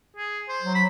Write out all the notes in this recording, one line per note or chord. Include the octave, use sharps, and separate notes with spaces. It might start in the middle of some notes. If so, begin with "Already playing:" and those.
G#4
C5
F#3
B5